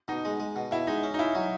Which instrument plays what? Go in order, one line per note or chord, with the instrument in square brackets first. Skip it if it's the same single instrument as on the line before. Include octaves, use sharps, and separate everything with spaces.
[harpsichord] B2 [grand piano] D#4
[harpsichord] G#3
G#3
B2
[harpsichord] B2 [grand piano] E4
[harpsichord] G#3 [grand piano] D#4
[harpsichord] C#4
[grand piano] D#4
[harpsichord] C#4 [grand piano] E4
[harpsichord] F#3 [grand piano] D#4